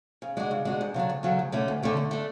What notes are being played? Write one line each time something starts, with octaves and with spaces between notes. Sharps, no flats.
C#3
G#3 D4 F#4
C#3
G#3 D4 F#4
D2
C#3 F#3 A3 D4
D2
C#3 F#3 A3 D4
D2
D3 A3 C#4
D2
D3 A3 C#4
D3
A3 D4